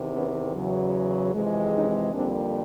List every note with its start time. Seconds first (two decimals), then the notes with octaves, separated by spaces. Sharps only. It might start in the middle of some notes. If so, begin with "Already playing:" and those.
Already playing: E2 C3 D#3
0.13 B3 C#4
0.54 E2 C#3 F#3
1.34 F2 C3 E3 G#3
1.74 C#4 D#4
2.14 F2 D3 G3 A#3 C4 D4